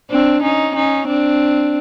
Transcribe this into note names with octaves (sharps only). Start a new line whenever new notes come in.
C4 D4
C#4 D#4
C#4 D#4
C4 D4